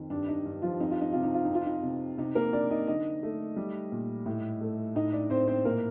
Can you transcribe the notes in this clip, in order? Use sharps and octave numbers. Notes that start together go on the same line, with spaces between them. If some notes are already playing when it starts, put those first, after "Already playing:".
Already playing: F2 D#3
G2 D4
D#4
G2
F3 F4
F2 D#4
F4
D#4
C3 F4
D#4
F4
F2 D#4
F4
D#4
C3
C3 D#4
A#3 A#4
C3 D4 D5
D#4 D#5
D3 D#4 D#5
A3
G3
A#2
A2
A3
A2 D#4 D#5
D4 D5
A2 C4 C5
C4 C5
A#2 A#3 A#4